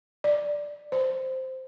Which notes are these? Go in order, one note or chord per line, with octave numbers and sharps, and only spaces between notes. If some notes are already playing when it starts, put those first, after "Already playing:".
D5
C5